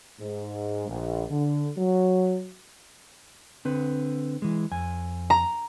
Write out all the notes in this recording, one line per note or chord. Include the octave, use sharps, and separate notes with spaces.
G#2
A#1
D3
F#3
D3 C4 B4
E3 G#3
F2 G#5
A#5